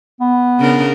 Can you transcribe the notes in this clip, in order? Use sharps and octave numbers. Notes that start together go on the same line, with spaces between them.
B3
C#3 D4 A#4